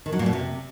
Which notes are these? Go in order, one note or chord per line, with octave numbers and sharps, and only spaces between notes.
D#3
F#3
A#2
B2
C3